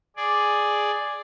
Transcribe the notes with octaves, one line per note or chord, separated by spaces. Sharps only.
G#4 D5